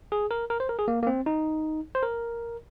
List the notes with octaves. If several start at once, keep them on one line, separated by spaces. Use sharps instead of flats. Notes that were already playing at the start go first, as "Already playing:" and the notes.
G#4
A#4
A#4
C5
A#4
G#4
A#3
A#3
C4
D#4
C5
A#4